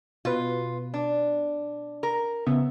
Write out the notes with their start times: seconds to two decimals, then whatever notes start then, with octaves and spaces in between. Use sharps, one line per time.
0.25 B2 F4 B4
0.94 D4
2.03 A#4
2.46 C#3 B3 E5